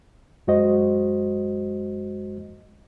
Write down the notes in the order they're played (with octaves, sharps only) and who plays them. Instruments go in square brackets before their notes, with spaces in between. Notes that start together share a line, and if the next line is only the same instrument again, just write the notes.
[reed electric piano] F#2 G#3 F#4 C5 D#5